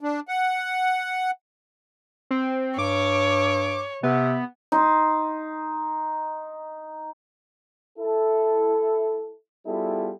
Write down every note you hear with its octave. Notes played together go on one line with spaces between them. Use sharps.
D4
F#5
C4
G2 C#5 D6
C3 B3
D#4 C6
E4 A4
G3 B3 E4 F4 G#4 A4